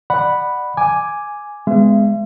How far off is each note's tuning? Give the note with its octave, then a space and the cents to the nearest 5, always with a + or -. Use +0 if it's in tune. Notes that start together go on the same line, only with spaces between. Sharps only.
D5 +30 F#5 +0 B5 +0
G#5 +0 D6 +0
G#3 +0 B3 +25 E5 +45